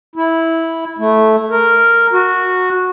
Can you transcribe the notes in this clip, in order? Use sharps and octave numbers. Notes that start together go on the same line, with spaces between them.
E4
A3
A#4
F#4